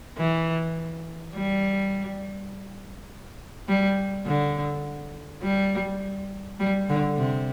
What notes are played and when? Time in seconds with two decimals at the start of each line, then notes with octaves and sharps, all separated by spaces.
0.17 E3
1.34 G3
3.68 G3
4.26 D3
5.42 G3
6.59 G3
6.89 D3
7.17 C3